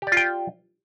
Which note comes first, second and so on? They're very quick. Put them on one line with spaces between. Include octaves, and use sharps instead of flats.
G4 D5 F4 G5